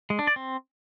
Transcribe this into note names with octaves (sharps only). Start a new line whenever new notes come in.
G#3
D4
D5
C4